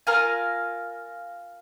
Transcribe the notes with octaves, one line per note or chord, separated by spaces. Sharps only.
F4 A#4 F5 G#5